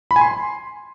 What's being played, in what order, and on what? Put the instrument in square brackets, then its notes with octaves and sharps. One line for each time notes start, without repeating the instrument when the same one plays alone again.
[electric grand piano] B5
G#5
C6